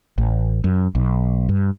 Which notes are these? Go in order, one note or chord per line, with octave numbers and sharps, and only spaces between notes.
A1
F#2
B1
G2